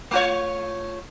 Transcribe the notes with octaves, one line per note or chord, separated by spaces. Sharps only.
A3 F4 C#5